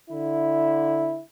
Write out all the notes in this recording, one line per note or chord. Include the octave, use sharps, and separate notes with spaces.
D3 E4